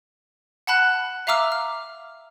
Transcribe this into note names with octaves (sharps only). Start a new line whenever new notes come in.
F#5 A5 B5 F#6
E5 F5 A#5 D6 E6 F6
F6